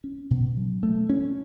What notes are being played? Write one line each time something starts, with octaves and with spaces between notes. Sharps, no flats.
C#4
B2
F#3
A3
C#4